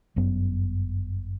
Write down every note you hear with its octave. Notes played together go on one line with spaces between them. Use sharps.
G1 F#2 F#3 B3